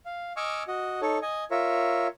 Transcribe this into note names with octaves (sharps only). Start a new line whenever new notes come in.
F5
D#5 G#5 C#6 D6 E6 F6
F#4 D#5
D#4 A4 C#5
D#5 G#5
F4 A#4 C#5 E5